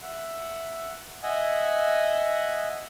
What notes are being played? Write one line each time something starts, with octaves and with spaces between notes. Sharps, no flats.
E5 F#5
D#5 E5 F#5 G#5